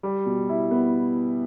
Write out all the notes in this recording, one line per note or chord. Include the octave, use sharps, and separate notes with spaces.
G3
B2
E4
B3